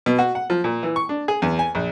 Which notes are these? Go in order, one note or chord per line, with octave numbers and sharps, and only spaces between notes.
B2
F#4
F#5
F3
A#2
E3
C#6
D4
G#4
E2
G#5
A#1